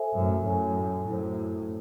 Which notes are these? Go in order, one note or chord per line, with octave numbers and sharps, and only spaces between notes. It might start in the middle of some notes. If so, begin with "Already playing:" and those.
Already playing: A4 C5 E5 G#5
F#2 A2
F#2 A2 A4 C#5 G#5
F#2 A2 E4 A4 C5